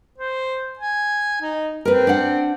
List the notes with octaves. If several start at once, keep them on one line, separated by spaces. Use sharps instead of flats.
C5
G#5
D#4
C4 A#4 B4
D4 F#5